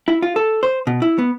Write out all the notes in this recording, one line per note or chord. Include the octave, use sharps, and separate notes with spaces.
E4
F4
A4
C5
B2
E4
B3